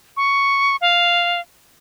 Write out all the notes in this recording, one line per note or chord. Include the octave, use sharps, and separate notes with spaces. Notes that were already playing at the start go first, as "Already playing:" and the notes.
C#6
F5